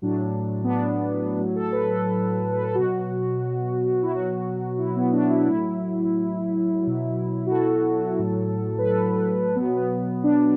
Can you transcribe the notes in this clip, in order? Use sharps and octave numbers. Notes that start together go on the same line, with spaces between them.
A2 F#3 D4
B3
D4
A2 F#3
A4
B4
A4
B4
A4
B2 F#3 F#4
E4
B2 F#3 F#4
E4
B3
D4
E4
D4
A2 F#3 E4
B2 F#3
F#4
A4
A2 F#3
B4
A4
B2 F#3 B3
B3
D4